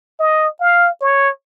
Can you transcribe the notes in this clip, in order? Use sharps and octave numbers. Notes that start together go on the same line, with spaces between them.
D#5
F5
C#5